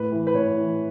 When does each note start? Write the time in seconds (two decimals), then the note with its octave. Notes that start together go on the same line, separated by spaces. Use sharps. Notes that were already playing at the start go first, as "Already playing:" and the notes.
Already playing: A2 B4
0.12 E3
0.27 B4
0.34 A2 C#5
0.57 E3